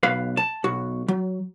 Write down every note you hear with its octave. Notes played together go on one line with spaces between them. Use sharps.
B1 B4 F5
A5
B1 F#4
F#3